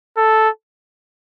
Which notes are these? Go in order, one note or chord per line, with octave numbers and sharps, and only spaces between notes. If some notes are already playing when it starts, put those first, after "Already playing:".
A4